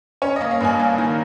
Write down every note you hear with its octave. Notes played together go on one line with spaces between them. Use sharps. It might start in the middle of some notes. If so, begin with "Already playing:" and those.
C#4 C#5
A#3 D#5
F5
G2 G#5
A#3
D#3